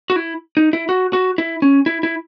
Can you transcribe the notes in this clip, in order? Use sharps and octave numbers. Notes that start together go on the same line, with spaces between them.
F#4
E4
D#4
E4
F#4
F#4
E4
C#4
E4
E4